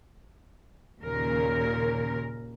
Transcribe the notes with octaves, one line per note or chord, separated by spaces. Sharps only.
D#2 A#2 C#3 A#4